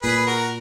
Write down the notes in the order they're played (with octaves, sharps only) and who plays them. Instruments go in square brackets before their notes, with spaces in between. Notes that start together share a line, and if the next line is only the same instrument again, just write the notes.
[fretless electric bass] A#2 [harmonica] G#4 B4
[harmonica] F#4 A#4